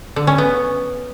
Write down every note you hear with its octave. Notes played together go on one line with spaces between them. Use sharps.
D3
C#4
B3